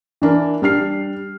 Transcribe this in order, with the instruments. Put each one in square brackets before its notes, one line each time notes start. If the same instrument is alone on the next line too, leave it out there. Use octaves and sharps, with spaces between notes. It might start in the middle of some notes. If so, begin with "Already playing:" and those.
[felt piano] E3 D4 A#4
G3 D4 F6 C7